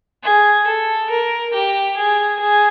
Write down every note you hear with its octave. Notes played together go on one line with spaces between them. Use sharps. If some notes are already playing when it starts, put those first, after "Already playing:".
G#4
A4
A#4
G4
G#4
G#4